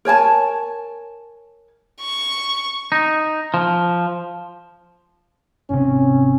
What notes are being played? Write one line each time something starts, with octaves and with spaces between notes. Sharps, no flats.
A#4 C#5 G#5 A5
C#6
D#4
F3
G#1 C3 C#4